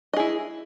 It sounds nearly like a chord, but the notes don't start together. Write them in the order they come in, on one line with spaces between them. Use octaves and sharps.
D#5 G#4 E4